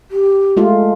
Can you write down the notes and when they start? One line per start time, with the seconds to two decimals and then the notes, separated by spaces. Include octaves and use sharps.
0.11 G4
0.57 G#3 A3 F4